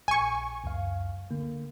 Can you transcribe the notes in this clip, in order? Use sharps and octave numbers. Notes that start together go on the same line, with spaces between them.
A#1 G#5 C#6
C#2 F#2 F5
D3 A#3